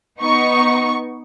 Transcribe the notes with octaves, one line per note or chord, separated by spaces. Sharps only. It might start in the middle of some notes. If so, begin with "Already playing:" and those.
B3 D#4 C#6